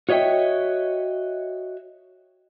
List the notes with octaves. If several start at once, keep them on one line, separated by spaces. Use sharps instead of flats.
F#4 C#5 D#5 E5 G5